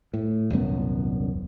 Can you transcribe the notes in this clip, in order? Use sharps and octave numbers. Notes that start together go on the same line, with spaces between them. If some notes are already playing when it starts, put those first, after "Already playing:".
A2
D#1 C2 F#2 B3